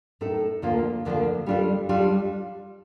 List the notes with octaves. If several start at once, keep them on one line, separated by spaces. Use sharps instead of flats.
A2 A3 D#4 A4
D2 D3 F3 A#3 F4
D2 D3 F3 A#3 F4
G3 D4 F4 A4
G3 D4 F4 A4